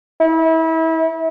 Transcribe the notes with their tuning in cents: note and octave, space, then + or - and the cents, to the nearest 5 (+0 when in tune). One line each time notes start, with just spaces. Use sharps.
E4 -30